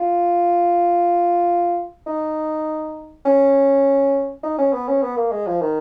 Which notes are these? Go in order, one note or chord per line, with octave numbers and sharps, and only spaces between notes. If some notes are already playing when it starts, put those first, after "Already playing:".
Already playing: F4
D#4
C#4
D#4
C#4
B3
C#4
B3
A#3
G#3
F3
D#3